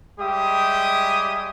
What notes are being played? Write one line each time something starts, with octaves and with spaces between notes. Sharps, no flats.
G3 G#3 G4 E5 G5 D#6